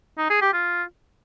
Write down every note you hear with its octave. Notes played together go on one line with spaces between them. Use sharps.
D#4
G#4
G4
F4